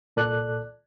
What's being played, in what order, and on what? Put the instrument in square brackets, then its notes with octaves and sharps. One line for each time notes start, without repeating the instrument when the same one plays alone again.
[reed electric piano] C2 A#2 A4 D5 F#6